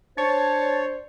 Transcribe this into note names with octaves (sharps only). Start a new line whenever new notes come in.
D4 C5 C#5 A5